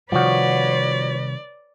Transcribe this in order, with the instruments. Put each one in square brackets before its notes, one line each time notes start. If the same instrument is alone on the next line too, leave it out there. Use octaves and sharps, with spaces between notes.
[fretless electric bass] C3 D#3 G3 [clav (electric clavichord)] F3 F#4 [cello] B4 C#5 [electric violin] D5